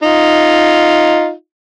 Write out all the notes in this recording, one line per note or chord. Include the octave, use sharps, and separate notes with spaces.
D#4 F4